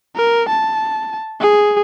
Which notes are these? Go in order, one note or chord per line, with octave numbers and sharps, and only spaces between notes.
A#4
A5
G#4